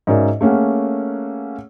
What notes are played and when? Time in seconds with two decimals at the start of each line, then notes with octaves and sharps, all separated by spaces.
0.07 G#2 C#4 F#4 A#4 D5 E5
0.41 A3 A#3 C#4 G#4 F#5